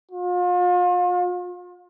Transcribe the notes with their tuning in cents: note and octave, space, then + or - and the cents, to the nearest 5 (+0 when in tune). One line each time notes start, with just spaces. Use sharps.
F4 +35